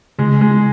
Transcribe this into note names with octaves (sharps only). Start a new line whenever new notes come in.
C#3 G#3
G#3